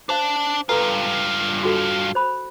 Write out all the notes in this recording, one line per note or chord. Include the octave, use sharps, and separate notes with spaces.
D4 C5 F5 A5
G2 F4 A4 B4 A#5
F#4 A4
C5 B5